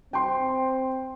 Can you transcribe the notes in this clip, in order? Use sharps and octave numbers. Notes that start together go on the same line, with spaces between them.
C4 G5 C6